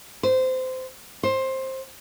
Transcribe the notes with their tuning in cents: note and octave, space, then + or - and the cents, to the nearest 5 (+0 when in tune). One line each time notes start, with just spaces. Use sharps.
C5 -20
C5 +15